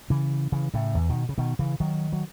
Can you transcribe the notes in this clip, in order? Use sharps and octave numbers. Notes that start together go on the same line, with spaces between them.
C#3 E3
C#3 E3
A2 C#3
E2
B2 D#3
C#3
B2 D#3
C#3 E3
D#3 F#3
F#3